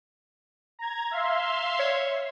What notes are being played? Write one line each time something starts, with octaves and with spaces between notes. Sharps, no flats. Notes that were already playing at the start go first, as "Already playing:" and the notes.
A#5 G#6
E5 F5 C6
C#5